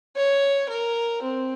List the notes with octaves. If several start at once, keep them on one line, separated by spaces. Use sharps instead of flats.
C#5
A#4
C4